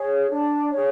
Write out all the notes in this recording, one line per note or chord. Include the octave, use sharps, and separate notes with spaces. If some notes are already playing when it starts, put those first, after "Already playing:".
Already playing: G#4 C#5
D4
G#4 C#5